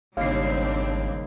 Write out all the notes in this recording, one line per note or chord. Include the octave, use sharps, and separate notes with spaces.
G#1 D#2 C#3 G3 C4 D4 F5 C7